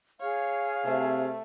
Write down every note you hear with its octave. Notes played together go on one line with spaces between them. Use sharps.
G#4 C#5 F5 F6
C3 A3